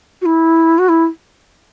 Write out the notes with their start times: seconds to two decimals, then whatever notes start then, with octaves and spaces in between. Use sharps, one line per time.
0.22 F#4
0.26 E4
0.79 F#4
0.89 E4